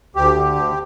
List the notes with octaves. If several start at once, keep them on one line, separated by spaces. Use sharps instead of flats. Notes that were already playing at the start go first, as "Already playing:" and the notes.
D2 G4
D3
D2